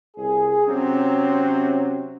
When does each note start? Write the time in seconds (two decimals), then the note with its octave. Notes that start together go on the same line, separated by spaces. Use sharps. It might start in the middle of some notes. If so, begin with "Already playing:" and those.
0.17 C2 G#4
0.67 C3 F#3 C4 C#4